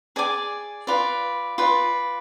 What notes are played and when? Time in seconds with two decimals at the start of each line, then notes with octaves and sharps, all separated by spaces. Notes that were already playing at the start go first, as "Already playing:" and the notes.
0.16 G#4 D5 G#5 D6
0.87 F4 B4 D5
1.58 F4 B4 D5